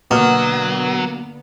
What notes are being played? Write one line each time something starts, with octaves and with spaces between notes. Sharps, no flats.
B2 D3 F#3 A#3 B3 F6